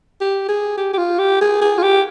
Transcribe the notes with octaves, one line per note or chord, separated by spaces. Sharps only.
G4
G#4
G4
G4
F4
G4
G#4
G#4
F4
G4